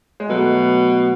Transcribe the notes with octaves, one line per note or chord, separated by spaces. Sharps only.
G#3
B2 F#3 A3